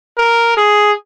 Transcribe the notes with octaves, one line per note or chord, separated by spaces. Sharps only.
A#4
G#4